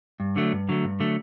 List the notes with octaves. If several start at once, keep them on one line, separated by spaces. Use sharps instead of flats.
G2
D3 F#3 A3
G2
D3 F#3 A3
G2
D3 F#3 A3